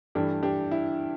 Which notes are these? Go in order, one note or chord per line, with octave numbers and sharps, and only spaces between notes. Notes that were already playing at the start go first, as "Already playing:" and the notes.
G2 E3 A3 D4 G4
D4 G4
E4